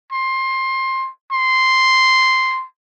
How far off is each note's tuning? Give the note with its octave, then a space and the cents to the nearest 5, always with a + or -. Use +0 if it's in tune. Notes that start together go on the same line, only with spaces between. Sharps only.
C6 +20
C6 -5